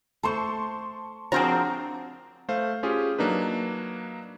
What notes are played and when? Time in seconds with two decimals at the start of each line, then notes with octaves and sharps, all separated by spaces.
0.23 A3 C5 A5 C6 C#6
1.32 F3 C4 D4 F#4 G#4 A#4 A#5
2.49 A3 C5 F5
2.83 C#4 F4 G4 G#4
3.19 F#3 A#3 D4 D#4 B4